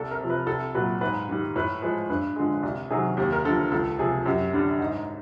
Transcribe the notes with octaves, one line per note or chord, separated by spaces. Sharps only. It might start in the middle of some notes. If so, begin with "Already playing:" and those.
Already playing: C2 A4
A#4
C3 F3
B4
C2 A4
A#2 F#3 B4
G#2 B4
D#3 G3
A2 B4
F3 G#3 B4
G2 B4
D3 F3 G#3
C2
C3 D#3 F#3 G#4
D#2 G4
A#4
D3 F3 A4
C#2 A4
C3 F3 G#4
F#2 G4
D3 G3 D4
G#2 D#4